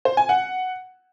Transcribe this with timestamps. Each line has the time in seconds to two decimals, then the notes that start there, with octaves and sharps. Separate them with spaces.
0.05 C5
0.17 G#5
0.29 F#5